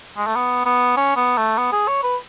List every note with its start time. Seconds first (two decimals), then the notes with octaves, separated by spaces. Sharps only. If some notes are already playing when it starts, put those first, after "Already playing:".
0.17 G#3
0.27 A3
0.36 B3
0.66 B3
0.97 C#4
1.16 B3
1.38 A3
1.58 B3
1.72 G#4
1.88 C#5
2.03 B4